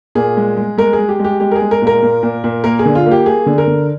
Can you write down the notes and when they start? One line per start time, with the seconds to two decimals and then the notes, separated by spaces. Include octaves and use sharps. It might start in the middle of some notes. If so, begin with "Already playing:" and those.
0.15 A#2 G#4
0.37 G#3
0.57 G#3
0.78 G#3 A#4
0.93 G#4
0.98 G#3
1.09 G4
1.19 G#3
1.25 G4
1.40 G#3 G4
1.51 A#4
1.56 G#4
1.61 G#3
1.71 A#4
1.82 A#2 A#4
2.02 A#2
2.23 A#2
2.44 A#2
2.64 A#3 A#4
2.79 G#4
2.85 D3
2.95 F4
3.06 A#3
3.11 G4
3.26 A#3 G#4
3.46 D3
3.58 A#4
3.68 D3